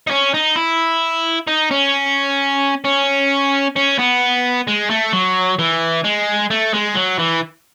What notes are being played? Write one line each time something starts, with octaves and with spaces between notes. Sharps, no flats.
D#4
C#4
D#4
E4
D#4
C#4
C#4
C#4
B3
G#3
A3
F#3
E3
G#3
A3
G#3
F#3
E3